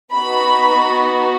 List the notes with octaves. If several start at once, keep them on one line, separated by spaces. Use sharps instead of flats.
B3 D#4 F#4 B5